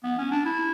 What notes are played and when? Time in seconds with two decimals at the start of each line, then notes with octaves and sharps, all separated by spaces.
0.03 B3
0.18 C#4
0.31 D4
0.45 E4